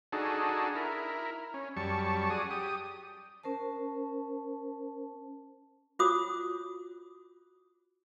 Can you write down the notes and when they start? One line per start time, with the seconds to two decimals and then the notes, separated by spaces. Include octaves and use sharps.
0.13 D4 D#4 F#4 G#4 A4
0.75 E4 A#4
1.54 C#4
1.77 F#2 G3 A5 C#6
2.30 F#4 G#4 D5 D#6
2.50 G4 D#6
3.43 C#4 A#4 C5 A5
5.99 F4 F#4 C5 C#5 D6 D#6